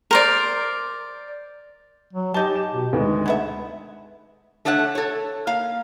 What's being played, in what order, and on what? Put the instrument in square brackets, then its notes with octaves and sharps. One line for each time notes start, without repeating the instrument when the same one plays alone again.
[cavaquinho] A#4 C5 D5
[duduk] F#3
[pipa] G#3 D#4 A5 [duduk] G4 [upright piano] G7
[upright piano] E7
[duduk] B2
[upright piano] D2 D#3 B3 [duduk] G#3
[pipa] F#3 B3 E5 [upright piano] A3
[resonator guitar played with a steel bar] A3 D4 A4 C#5 F#5
A4 C#5
A#3 F5